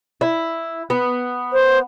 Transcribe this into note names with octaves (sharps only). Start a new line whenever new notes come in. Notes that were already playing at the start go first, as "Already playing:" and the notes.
E4
B3
C5